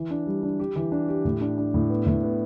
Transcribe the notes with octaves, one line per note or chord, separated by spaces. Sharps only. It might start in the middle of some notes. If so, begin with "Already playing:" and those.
Already playing: E3
D4
G3
D4
G4
E3
D4
G4
A2
D4
D4
A2
B3
A2
B3